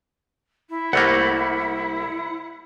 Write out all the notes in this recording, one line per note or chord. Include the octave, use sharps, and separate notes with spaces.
E4
C2 A3 A#3 F#5